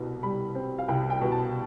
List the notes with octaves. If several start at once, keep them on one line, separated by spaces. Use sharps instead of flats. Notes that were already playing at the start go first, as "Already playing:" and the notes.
Already playing: C2 B2
G3 B5
C4
F5
C2 G5
G5
B2
A5